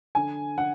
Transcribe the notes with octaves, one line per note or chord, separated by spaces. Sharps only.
D3 G#5
D3 F#5